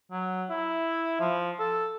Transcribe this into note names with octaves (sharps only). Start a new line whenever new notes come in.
F#3
E4
F3
A4